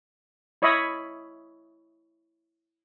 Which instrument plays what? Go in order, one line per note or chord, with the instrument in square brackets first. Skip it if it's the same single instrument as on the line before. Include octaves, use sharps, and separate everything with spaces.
[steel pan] E4 C#5 D#5 E5 B5